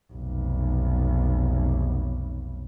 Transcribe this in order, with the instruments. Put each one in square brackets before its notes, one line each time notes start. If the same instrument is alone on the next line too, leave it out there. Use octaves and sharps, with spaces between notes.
[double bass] F1 B1